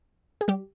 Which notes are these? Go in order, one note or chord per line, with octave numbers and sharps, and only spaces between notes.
G#4
G3 G4